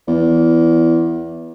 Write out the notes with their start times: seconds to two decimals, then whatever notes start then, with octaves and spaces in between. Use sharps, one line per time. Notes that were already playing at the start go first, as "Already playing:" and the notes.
0.08 E2